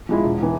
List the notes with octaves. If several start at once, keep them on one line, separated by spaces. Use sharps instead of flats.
F3 G#3 E4
E1
E3